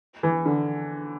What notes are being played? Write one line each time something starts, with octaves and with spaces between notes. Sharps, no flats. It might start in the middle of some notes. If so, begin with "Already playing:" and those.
E3
D3